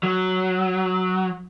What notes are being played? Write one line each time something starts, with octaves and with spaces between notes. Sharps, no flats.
F#3